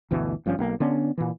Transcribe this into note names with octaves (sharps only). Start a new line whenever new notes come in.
G1 D2 B2 E3
G1 G2 F3 C#4
B1 A#3
D3 B3 C#4 D4
A#2 E3